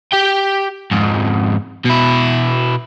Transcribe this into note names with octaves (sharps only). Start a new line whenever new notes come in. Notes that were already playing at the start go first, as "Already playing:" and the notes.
G4 G5
F2 G#2
B2 E4